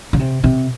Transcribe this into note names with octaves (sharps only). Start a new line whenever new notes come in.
C#3
C3
C3